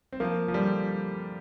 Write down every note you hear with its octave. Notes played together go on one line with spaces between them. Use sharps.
C4
F3 A#3
F3
D3 G3